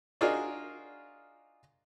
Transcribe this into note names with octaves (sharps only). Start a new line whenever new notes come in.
D4 D#4 F4 F#4 G#4 A#4